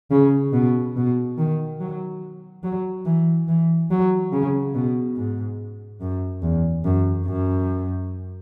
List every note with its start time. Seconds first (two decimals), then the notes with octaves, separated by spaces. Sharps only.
0.11 C#3
0.53 B2
0.96 B2
1.38 D#3
1.80 F#3
2.63 F#3
3.05 E3
3.48 E3
3.90 F#3
4.32 C#3
4.75 B2
5.16 G#2
6.01 F#2
6.42 E2
6.84 F#2
7.26 F#2